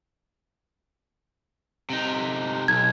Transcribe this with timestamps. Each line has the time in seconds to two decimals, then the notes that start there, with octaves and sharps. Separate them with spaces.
1.90 C3 D#4
2.68 B1 G#6